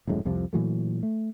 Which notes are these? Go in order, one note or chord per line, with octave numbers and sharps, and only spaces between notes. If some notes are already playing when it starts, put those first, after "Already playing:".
D#1 F#2 A2 G#3
C2 F2 C3 F3
A#2 E3 F#3 A3
A3